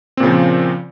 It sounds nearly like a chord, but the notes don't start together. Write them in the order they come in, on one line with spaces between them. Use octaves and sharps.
C4 A#2 C#3 F3